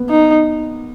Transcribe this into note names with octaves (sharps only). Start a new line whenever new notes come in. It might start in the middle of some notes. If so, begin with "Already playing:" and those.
Already playing: A#3 B3
D#4